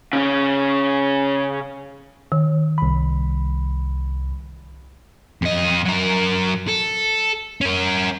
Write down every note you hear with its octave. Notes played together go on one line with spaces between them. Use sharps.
C#3 C#4
D#3
C2 B5
F2 D#5
F#3 A#4
A4
C#4 A#4